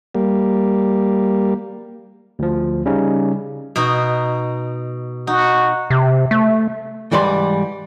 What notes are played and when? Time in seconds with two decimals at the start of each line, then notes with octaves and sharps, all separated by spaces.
0.15 G3 A#3
2.39 D2 F3
2.86 C#3 G3 C#4 D#4
3.76 B2 D#4 F#4
5.27 D#4 F#4
5.90 C3
6.31 A3
7.12 G#2 E3 G3 D5 C6